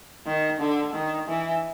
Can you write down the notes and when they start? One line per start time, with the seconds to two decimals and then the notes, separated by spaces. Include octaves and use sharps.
0.26 D#3
0.60 D3
0.93 D#3
1.28 E3